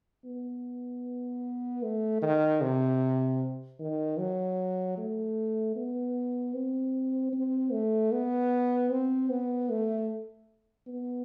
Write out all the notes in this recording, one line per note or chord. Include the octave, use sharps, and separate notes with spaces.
B3
A3
D#3
C3
D#3
F#3
A3
B3
C4
C4
A3
B3
C4
B3
A3
B3